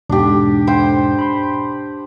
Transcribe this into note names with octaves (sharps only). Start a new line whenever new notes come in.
E2 G#2 B2 D4 G4
C5 G5
B5 C6